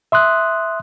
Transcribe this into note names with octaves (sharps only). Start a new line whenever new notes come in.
E5 C6 D#6 F#6